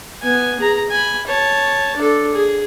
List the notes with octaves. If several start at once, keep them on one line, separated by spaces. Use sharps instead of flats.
B3 G#5
G#4 A#5
G#5 B5
C#5 A5
D4 A4
G#4